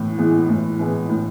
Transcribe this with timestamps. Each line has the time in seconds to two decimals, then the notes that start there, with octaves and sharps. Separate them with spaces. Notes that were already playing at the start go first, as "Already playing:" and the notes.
Already playing: A2 E3 B3
0.18 E3 G#3 B3
0.49 A2
0.79 E3 G#3 B3
1.10 A2